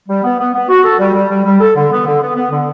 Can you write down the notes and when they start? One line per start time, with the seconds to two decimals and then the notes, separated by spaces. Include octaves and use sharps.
0.08 G3
0.23 B3
0.39 B3
0.54 B3
0.69 F#4
0.84 A4
0.99 G3
1.15 G3
1.29 G3
1.45 G3
1.61 A4
1.76 D3
1.91 B3
2.06 D3
2.21 B3
2.36 B3
2.51 D3